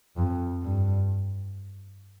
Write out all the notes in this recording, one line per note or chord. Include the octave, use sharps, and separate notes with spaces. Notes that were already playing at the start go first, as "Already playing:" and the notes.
F2
G2